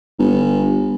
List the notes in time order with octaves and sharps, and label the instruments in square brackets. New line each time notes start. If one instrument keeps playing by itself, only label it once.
[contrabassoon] G1